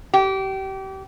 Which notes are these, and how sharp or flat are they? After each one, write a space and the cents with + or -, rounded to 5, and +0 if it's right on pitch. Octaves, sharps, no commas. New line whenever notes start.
G4 -30